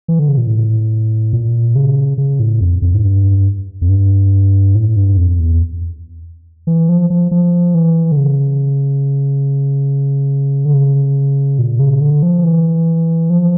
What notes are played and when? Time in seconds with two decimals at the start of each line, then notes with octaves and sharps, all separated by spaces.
0.08 E3
0.19 D3
0.29 C#3
0.38 A#2
0.47 A2
1.33 A#2
1.75 C#3
2.18 C#3
2.40 A2
2.61 F2
2.82 F2
2.94 A2
3.03 G2
3.81 F2
3.89 G2
4.75 A2
4.97 G2
5.17 F2
5.39 E2
6.67 E3
6.89 F3
7.10 F3
7.31 F3
7.75 E3
8.12 D3
8.17 C#3
10.65 D3
10.74 C#3
11.59 A#2
11.80 C#3
12.01 D3
12.23 F3
12.44 E3
13.30 F3